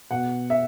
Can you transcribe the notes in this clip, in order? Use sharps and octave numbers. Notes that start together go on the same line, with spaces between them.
B2 F#5
E5